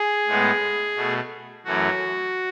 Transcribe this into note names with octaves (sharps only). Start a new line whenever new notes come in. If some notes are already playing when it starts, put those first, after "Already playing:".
Already playing: G#4
A2 G#3 B3
B2 A3
F#2 E3 A3 F#4